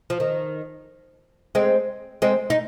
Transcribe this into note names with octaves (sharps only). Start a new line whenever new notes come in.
F3
D#3
G#3 C4
G#3 C4
D#4